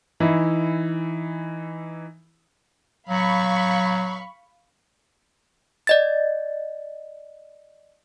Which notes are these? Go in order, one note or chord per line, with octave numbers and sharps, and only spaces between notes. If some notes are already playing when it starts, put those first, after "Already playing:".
E3 D#4 E4
F#3 F5 B5 C#6
D5 D#5 A6